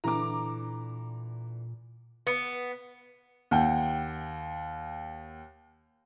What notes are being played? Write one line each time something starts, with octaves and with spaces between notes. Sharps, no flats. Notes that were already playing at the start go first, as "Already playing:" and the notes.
A#2 D3 E3 A#5 D6
B3
D#2 F#5 G5